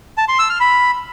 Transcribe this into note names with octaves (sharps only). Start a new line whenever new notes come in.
A5
C6
E6
F6
B5